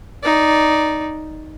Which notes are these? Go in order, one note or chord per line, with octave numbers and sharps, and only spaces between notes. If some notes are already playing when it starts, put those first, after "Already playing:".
D#4 D5